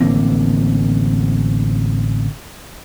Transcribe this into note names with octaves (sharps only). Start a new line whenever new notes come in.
A1 D3 A#3 C4